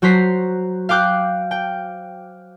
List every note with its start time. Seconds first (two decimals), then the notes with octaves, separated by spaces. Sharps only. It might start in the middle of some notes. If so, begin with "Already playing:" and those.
0.02 F#3 F#4 C5 A#5 B6 C7
0.89 F5 G5 D6 F#6 G6
1.51 G5